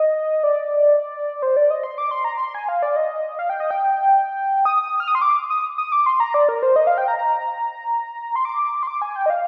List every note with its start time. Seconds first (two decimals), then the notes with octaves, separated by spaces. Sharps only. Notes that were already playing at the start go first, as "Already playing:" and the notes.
Already playing: D#5
0.44 D5
1.42 C5
1.56 D5
1.70 D#5
1.84 C6
1.98 D6
2.11 C6
2.24 A#5
2.38 C6
2.55 G#5
2.69 F5
2.82 D5
2.96 D#5
3.39 F5
3.50 G5
3.60 D#5
3.71 G5
4.65 D#6
5.00 F6
5.08 D#6
5.15 C6
5.22 D6
5.50 D#6
5.78 D#6
5.92 D6
6.06 C6
6.20 A#5
6.34 D5
6.49 A#4
6.63 C5
6.76 D#5
6.87 F5
6.98 G5
7.08 A#5
7.19 A#5
8.36 C6
8.45 D6
8.83 C6
8.87 D6
9.02 G#5
9.16 G5
9.26 D#5
9.30 F5